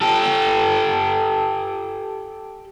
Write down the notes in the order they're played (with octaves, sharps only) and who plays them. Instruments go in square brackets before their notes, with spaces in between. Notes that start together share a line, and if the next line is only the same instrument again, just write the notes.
[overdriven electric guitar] G4 A4